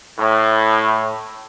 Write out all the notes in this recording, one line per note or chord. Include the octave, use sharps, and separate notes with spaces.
A2